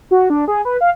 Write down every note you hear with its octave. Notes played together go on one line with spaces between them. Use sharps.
F#4
D4
G#4
B4
F5